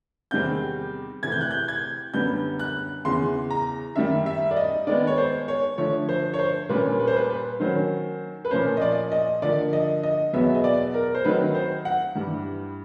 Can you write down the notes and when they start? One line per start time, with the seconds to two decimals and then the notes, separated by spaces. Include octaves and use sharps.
0.31 E2 C3 D#3 G3 C4 G6
1.23 C3 E3 A3 G#6
1.32 G6
1.41 F#6
1.51 G6
1.68 G#6
2.14 F#2 D3 G3 B3 D4 G6
2.59 F#6
3.05 E2 C#3 E3 C6
3.50 A#5
3.96 F#2 D#3 G3 E5
4.26 E5
4.51 D5
4.57 D#5
4.87 D#3 G#3 B3 D5
5.07 C#5
5.18 C5
5.48 C#5
5.78 D3 F3 A3 D4 C#5
6.09 C5
6.33 C#5
6.39 C5
6.69 A#2 G3 A#3 C#4 B4
6.99 B4
7.07 C5
7.16 B4
7.30 B4
7.60 D#3 F#3 A#3 C#4 C5
8.45 B4
8.51 A#2 F3 A#3 C#4 C5
8.77 D#5
8.82 D5
9.12 D#5
9.42 D3 F3 A#3 D5
9.73 D#5
10.03 D#5
10.33 E2 B2 F#3 B3 E5
10.55 D#5
10.64 D5
10.94 A#4
11.15 C5
11.24 D#3 F#3 A3 C4 D#4 B4
11.55 C5
11.85 F#5
12.15 G2 E3 G3